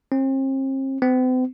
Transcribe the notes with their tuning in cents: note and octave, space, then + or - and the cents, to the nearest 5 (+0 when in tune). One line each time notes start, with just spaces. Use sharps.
C4 +40
C4 -45